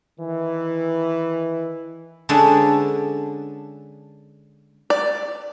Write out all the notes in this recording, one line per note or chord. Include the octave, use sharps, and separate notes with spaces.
D#3 E3
D3 G#3 C#4 D4 A4 B4
D5